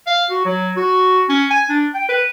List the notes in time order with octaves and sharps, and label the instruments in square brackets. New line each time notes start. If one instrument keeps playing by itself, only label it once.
[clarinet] F5
F#4
F#3
F#4
C#4
G#5
D4
G5
B4